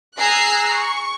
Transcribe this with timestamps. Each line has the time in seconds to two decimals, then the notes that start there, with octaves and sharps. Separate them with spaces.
0.19 G#4 G#5 A#5 E6 F#6 C7
0.73 C#6